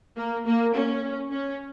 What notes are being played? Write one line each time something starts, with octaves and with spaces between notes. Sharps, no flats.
A#3
A#3
C#4
C#4